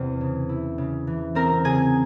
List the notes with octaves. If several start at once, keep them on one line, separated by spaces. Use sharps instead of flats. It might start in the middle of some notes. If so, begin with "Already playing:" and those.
Already playing: E2 C3 G3 C5
C#3
E4
C#3
E3
C4 A#4 A#5
C#3 G#4 G#5